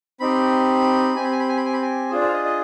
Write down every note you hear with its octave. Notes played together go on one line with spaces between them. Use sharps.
C4 D#4 G4 B5
C4 G4 G#5
B5
G#5
B5
G#5
B5
G#5
B5
G#5
D4 F4 G#4 C5
C5
F5
D#5
D#5